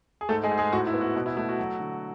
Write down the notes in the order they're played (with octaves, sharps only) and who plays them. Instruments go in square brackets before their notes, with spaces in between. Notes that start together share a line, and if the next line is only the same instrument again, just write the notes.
[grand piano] G#4
G#2 A3 A4
G#3 G#4
G#2
G#3 G#4
A2 F#4
E4
B3
F#4
B2
E4
A3 E4
F#4
F#3
D3